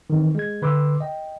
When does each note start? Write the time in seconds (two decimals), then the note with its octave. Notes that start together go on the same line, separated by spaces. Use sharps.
0.10 D#3 E3 C4
0.35 G#3 G#6
0.62 D3 B4 C6 D6 E6
1.00 D#5 G5